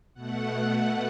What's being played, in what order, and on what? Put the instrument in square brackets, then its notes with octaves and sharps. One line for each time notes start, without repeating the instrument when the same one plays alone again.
[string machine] B2 A3 F#5